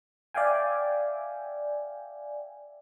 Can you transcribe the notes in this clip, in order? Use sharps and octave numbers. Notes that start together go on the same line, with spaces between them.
D5 E5 F5 G5 G#5